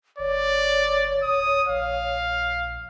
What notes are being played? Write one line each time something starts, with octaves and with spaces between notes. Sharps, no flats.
G1 C#5 D5
D1 D#6
A#1 F5